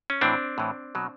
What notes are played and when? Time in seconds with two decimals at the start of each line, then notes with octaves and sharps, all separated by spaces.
0.10 C#4
0.21 A2 E3 C4 D4
0.58 A2 E3
0.95 B2 F#3